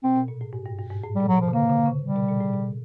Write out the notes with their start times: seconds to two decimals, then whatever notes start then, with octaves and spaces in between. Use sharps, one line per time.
0.04 B2 C4
0.16 B2
0.28 A#2
0.41 A2
0.53 G#2
0.66 G2
0.78 G2
0.91 G#2
1.03 A2
1.15 G3
1.20 A#2
1.28 F#3
1.37 B2 F3
1.48 D3
1.53 C#3 A#3
1.70 D3
1.86 C#3
2.03 G3
2.16 B2
2.29 A#2
2.41 A2
2.53 B2